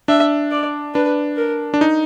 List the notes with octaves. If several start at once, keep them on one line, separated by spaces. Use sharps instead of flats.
D4 E5
D5
D4 B4
A#4
D4
D#4